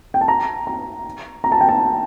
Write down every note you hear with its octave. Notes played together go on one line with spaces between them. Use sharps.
G5
A5
A#5
A#5
A#5
A5
G5
A5